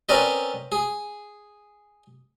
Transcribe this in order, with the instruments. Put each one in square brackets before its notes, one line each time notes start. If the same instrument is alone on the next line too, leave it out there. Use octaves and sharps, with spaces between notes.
[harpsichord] C4 C#4 A#4 B4 D5 D#5
G#4